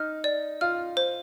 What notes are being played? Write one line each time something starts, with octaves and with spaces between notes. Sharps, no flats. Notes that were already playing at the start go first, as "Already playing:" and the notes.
Already playing: D#4 F6
D5
F4 F6
C5